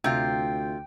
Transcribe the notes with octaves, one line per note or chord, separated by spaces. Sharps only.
D2 C3 F4 G5